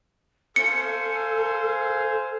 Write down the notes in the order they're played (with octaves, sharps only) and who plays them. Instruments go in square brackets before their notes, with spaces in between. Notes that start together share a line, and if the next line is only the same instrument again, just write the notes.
[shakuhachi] A4 [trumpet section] C5 F5 G#5 [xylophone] C#7